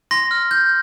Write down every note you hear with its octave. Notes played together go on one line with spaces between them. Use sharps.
C6 A#6
F6
G6